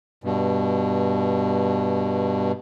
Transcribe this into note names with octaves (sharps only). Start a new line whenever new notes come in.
G2 B2